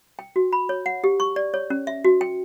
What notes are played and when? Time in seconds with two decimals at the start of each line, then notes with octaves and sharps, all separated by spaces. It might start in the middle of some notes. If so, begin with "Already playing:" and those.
0.19 G5
0.36 F#4
0.53 B5
0.69 C#5
0.86 F#5
1.04 G4
1.20 C#6
1.36 D5
1.54 C#5
1.70 C#4
1.87 E5
2.04 F#4
2.21 G5